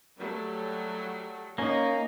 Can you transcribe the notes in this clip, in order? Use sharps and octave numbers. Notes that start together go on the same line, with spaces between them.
F#3 G3 A3
A#3 C#4 D#4